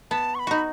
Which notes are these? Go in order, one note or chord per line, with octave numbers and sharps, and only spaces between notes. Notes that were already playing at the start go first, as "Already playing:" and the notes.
B3 A5
C#6
B5
D#4 F#4